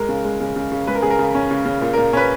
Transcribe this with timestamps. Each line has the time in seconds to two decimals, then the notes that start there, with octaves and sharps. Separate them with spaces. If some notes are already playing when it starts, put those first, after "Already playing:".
Already playing: G#3 A#4
0.09 C#3
0.25 G#3
0.40 C#3
0.56 C#3
0.72 C#3
0.87 G#3 B4
0.95 A#4
1.02 C#3 G#4
1.10 A#4
1.19 C#3
1.35 C#4
1.51 C#3
1.65 C#3
1.81 A#2
1.94 A#4
1.97 A#2
2.13 C#4 B4